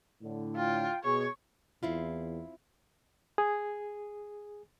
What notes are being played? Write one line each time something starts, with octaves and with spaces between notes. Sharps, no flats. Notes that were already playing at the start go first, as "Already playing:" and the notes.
A2 D3
F4 G5
B2 G#4 C#5 C#6
E2 C4 E4 F4
G#4